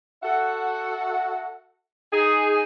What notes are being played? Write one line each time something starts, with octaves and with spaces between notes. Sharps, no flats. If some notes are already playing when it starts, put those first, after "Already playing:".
F#4 A4 E5 F#5
D#4 G#4